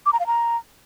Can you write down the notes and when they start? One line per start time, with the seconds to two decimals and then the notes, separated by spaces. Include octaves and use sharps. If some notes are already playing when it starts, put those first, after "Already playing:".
0.06 D6
0.13 A#5
0.20 F5
0.27 A#5